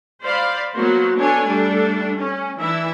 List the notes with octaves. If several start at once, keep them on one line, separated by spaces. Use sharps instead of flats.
C5 D5 F5 B5
F#3 A#3 B3 F#4 C5
B3 D4 A4 C#5 G#5
G3 A3 D4 A4
C#4
E3 D4 E4 E5